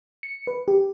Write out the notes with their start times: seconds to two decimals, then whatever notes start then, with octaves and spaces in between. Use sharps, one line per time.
0.23 C#7
0.47 B4
0.68 G4